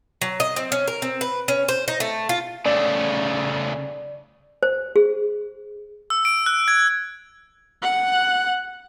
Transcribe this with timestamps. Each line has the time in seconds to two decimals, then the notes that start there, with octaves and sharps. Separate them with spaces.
0.22 F#3
0.40 D#5
0.56 C4
0.72 C#4
0.88 A#4
1.02 C4
1.21 B4
1.48 C#4
1.68 C5
1.88 D#4
2.00 A3
2.29 F4
2.66 C#3 A3 D5
4.63 C5
4.96 G#4
6.10 E6
6.25 D7
6.46 F#6
6.68 G#6
7.83 F#5 F#6